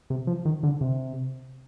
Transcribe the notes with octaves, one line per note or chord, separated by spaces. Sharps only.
C3
F3
D#3
D3
C3